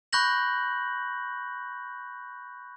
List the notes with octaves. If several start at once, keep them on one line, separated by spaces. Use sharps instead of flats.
B5 C#6 F#6 G6 A#6 F#7